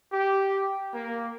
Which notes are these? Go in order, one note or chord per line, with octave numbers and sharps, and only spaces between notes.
G4
A#3